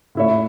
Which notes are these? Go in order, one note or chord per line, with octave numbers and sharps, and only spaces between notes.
A2 A3 E4 C#5 E5